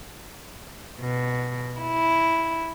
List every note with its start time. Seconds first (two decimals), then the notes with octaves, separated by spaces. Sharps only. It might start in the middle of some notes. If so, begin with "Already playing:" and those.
1.01 B2
1.81 E4